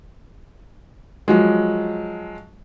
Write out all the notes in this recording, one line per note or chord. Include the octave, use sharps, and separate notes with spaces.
F3 F#3 G#3